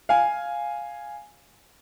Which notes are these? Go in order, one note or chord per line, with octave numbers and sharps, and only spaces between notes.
F5 G#5